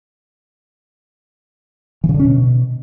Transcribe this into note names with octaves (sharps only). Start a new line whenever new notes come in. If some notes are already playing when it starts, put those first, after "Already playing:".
E3
C#3
D3
C#4
B2